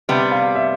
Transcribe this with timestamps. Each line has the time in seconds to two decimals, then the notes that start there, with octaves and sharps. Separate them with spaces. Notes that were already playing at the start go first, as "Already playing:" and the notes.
0.09 C3 G3 B3 E5
0.32 F5
0.55 E5